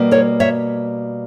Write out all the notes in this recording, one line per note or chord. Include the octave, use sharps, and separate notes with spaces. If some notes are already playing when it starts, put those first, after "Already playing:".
Already playing: B2 G3 A#3
A#4 C#5
C#5 E5